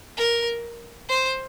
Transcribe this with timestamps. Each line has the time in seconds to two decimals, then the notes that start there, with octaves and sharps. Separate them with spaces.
0.17 A#4
1.09 C5